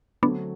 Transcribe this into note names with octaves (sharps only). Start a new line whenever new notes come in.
D3 F#3 A3 B3 C4 D4